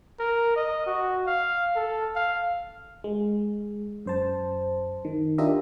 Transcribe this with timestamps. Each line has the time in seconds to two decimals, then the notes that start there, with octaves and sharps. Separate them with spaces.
0.19 A#4
0.56 D#5
0.87 F#4
1.26 F5
1.76 A4
2.15 F5
3.04 G#3
4.06 F#2 C5 A5
5.05 D#3
5.38 D4 F4 G4 A#4 D#5 E5